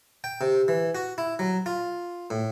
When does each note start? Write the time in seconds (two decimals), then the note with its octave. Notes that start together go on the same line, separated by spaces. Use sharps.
0.24 G5
0.41 C3
0.68 E3
0.95 F#4
1.18 E4
1.39 F#3
1.66 F4
2.30 A2